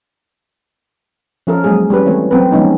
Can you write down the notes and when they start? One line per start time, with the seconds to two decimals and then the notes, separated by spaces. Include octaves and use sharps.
1.47 F3 C#4 A4 A#4
1.64 F#3 G#3 A#3 G#4
1.90 G3 C#4 B4
2.06 E3 A3 C4 C#5
2.31 F#3 C4 B4
2.52 D#3 F3 G#3 B3 C#4 D#4